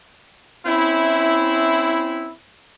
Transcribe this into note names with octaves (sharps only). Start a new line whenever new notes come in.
C4 C#4 E4